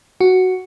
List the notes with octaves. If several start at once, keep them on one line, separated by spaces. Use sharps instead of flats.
F#4